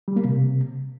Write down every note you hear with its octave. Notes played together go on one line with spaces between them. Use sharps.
G3
A#3
C3